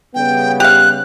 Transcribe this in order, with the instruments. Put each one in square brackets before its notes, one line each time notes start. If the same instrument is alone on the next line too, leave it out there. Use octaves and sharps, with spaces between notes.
[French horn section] C#3 G3 B3 [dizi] G5
[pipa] G4 F5 [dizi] F#6